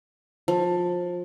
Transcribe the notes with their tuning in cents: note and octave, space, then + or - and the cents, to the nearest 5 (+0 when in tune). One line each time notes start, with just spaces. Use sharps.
F3 +20